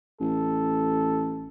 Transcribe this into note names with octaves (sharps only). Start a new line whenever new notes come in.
A1 A4